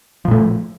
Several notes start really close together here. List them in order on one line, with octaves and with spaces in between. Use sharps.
F3 A#2 A3